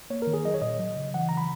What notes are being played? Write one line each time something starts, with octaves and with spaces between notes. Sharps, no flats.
A#3 C#5
A#4
D#3
G#4
F#3 D#5
C#5
A#2 D#5
F#3
C#3
E3 F#5
C#3 A#5
B5